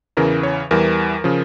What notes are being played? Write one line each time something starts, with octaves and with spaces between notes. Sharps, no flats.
E2 C#3 E3 A#4
C#5
E2 E3 G3 A#4
C#3 F3